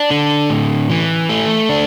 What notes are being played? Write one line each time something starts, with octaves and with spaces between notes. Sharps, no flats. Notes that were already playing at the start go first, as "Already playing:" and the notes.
Already playing: D4
D3
A2
E3
A3
D4